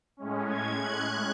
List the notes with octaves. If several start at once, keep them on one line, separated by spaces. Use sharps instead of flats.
A2 G#3 C#4
G#6
F#6